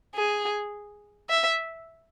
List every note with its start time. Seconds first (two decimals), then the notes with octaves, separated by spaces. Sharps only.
0.15 G#4
1.29 E5